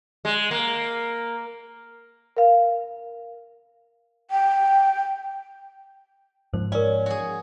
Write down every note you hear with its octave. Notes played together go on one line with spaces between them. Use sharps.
G#3
A#3
A#4 F5
G5
G#2 F3 C5
C#4 A#4 D5
F#4 G#4